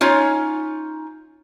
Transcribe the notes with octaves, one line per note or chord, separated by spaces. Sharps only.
C#4 D#4 F4 C#5